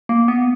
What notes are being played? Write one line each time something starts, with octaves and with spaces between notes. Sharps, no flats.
A#3
B3